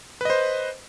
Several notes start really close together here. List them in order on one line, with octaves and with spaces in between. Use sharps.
B4 D#5 C5